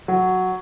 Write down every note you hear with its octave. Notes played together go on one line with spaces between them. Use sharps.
F#3